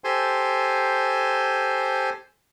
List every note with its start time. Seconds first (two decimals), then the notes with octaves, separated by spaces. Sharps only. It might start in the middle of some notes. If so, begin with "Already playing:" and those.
0.04 G4 A4 C5 G#5 C6